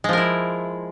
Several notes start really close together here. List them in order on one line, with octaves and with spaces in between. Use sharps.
G#3 F3 A#4 E4